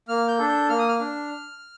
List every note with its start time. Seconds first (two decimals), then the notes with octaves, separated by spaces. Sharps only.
0.08 A#3 F6
0.28 G6
0.39 D4 A4
0.49 G6
0.69 A#3 F6
0.79 D#6
0.88 F6
1.00 D4